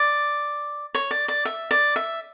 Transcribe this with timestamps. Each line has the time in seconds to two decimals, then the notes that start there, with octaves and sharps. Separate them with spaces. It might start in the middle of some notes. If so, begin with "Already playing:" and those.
Already playing: D5
0.94 C#5
1.11 D5
1.28 D5
1.45 E5
1.71 D5
1.96 E5